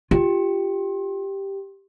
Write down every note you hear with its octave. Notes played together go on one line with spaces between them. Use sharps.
F4 G4